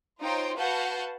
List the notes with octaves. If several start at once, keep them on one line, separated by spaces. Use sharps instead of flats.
D#4 F4 C5 C#5 G5 C6
F#4 B4 F5 F#5 A5 G6